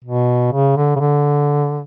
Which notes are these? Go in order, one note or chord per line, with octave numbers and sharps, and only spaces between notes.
B2
C#3
D3
C#3
D3